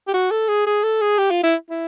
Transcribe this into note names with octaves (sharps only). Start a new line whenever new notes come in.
G4
F#4
A4
G#4
G#4
A4
G#4
G4
F4
E4
E4